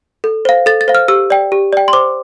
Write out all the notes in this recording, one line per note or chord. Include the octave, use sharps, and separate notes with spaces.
A4
C5 F5
A4 A6
A6
C5 F5
F6
G4 E6
D5 G5
G4
D5 G5
C6
C5 D6